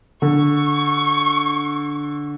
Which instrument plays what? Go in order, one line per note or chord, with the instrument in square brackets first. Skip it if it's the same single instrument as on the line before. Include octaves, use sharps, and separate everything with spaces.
[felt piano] D3 [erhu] C#6